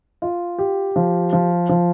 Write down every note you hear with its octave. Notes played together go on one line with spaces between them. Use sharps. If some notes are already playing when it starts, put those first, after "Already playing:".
F4
G4
F3
F3
F3